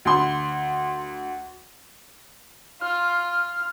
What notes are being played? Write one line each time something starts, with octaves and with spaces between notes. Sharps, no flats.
D2 C6
F4 F6